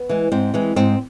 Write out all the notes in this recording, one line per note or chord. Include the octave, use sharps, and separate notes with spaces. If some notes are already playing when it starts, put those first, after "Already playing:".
Already playing: B3
E3 G#3
G#2 C4
E3 G#3
G#2 C4